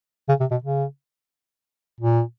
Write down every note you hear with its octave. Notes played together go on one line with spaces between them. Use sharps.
C#3
C3
B2
C#3
A#2